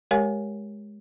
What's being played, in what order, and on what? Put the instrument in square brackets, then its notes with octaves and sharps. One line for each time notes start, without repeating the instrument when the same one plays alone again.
[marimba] G#3 G4 A#4 C#5 F5 G#5